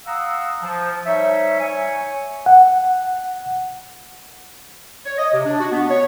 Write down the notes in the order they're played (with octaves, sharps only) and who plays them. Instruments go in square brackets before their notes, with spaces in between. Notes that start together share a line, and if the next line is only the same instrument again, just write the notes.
[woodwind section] F5 F#5 A#5 D#6 E6
F3
G3 D#4 C#5 E5
C#5 G#5
[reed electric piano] F#5
[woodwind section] C#5
D#5
C3
D4
F#4
B3
C#5